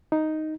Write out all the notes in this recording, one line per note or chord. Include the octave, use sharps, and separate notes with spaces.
D#4